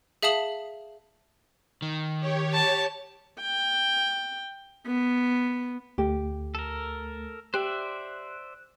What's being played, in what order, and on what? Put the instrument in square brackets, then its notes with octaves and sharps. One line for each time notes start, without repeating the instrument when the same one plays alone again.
[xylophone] G#4 E5 F5 A5 D#6 F#7
[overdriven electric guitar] D#3
[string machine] G4 C#5
[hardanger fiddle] A5
[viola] G5
B3
[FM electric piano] D2 A3 [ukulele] G4
[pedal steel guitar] A4 A#4
[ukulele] G4 [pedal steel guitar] C5 D5 E5 [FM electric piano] F#6